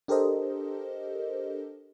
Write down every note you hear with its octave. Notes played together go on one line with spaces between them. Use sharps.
D4 G4 A4 A#4 C5 D#5